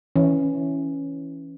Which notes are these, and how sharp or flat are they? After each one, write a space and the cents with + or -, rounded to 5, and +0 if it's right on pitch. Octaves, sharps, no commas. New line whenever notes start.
E3 +0 C#4 +0